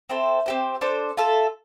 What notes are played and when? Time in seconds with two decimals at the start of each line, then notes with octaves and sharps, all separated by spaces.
0.09 C4 E4 A4 C5
0.46 C4 G4 C5
0.81 D4 A4 C5
1.17 F4 A4 E5